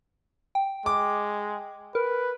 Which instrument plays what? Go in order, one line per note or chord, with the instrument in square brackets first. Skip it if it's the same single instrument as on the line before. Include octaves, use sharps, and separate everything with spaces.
[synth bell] G5
[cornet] G#3 [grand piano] D6
[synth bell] A#4 [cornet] B4